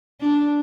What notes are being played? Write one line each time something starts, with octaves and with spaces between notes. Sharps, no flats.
D4